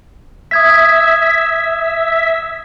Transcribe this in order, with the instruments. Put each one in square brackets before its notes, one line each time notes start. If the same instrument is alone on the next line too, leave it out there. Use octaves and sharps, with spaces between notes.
[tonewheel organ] E5 [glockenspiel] D#6 G#6 B6